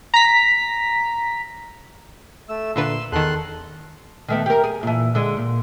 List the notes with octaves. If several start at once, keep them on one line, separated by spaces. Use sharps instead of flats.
A#5 B6
A3 E6
A#2 D3 B4 C6 E6
E2 D#3 A4 C6 F#6
D#3 A3 B3
G4 A#4
G#4
A#2 E3
D3 G#3
A#2